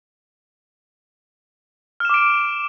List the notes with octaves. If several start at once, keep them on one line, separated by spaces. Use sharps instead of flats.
D6 F6 D7 E7